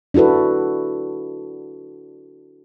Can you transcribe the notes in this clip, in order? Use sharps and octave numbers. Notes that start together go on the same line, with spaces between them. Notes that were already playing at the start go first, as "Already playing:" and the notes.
D4 E4 F#4 A4 B4